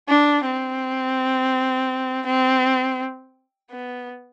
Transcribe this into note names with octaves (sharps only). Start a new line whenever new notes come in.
D4
C4
C4
B3